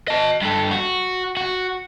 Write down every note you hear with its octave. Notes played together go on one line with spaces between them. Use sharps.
D#5 A5
G2 A4
F#4
F#4